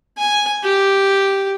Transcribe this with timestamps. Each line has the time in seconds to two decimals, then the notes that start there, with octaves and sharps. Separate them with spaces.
0.17 G#5
0.63 G4